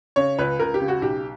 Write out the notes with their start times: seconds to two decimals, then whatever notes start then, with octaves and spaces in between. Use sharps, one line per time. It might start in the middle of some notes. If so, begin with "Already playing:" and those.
0.16 C#3 C#5
0.38 C#2 B4
0.59 C#2 A#4
0.74 G4
0.80 C#3
0.88 F#4
1.02 B1 G4